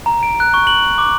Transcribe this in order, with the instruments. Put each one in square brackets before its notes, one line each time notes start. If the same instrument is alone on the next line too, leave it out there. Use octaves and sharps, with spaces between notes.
[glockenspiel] A#5
D7
F#6
C#6
F#7
F#7
D6